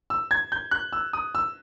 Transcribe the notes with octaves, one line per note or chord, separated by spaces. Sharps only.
E6
G#6
G6
F#6
E6
D#6
E6